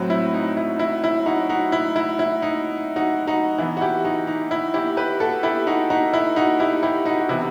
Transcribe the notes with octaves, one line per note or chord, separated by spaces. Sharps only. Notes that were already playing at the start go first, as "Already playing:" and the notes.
Already playing: A2 F#3 C4
E4
D#4
E4
E4
E4
D#4 F#4
D#4 F#4
E4
E4
E4
D#4
D#4 F#4
D#4 F#4
E3 B3 E4
F#4
E4 G4
D#4 F#4
D#4
E4
E4 G4
G4 B4
F#4 A4
E4 G4
D#4 F#4
D#4 F#4
E4
D#4 F#4
E4 G4
E4 G4
D#4 F#4
F#4
C3 E3 B3 E4